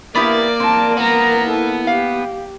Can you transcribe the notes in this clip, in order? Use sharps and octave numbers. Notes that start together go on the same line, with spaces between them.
A#3 B3 E4 G4 A#4 D5
C4 A#4 A5
B3 A#4 A#5
E4 A4
G4 F5